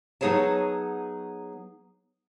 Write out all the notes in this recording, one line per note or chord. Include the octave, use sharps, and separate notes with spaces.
F#3 B3 D#4 G#4 C#5 A5